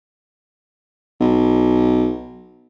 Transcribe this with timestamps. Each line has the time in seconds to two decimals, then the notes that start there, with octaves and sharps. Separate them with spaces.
1.21 B1